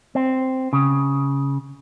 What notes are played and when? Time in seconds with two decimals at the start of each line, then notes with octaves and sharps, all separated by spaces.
0.15 C4
0.73 C#3